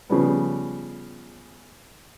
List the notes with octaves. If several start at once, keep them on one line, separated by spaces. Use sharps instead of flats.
C#3 F3 G3 B3